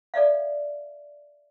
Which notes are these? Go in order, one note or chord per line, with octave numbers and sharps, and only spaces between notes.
A4 D5 E5 F5